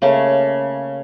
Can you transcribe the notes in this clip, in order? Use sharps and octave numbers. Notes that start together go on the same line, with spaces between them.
C#3 A3 A#3 C#4